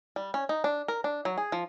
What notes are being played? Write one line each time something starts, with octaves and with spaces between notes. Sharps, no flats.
G3
C#4
D#4
D4
A#4
D4
F#3
G#4
F3